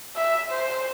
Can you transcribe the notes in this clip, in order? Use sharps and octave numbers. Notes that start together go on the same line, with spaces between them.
E5
C5